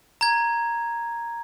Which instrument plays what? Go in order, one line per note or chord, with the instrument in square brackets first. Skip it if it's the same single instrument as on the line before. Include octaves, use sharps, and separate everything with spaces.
[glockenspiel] A#5 G#6